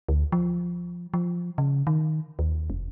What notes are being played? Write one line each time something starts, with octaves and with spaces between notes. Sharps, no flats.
D2
F3
F3
C#3
D#3
D#2
F1